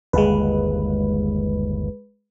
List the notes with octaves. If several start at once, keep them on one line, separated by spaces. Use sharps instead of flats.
G1 D#2 G#3 B4